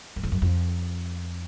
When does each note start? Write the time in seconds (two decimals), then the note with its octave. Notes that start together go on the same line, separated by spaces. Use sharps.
0.16 F#2
0.23 F2
0.32 F#2
0.42 F2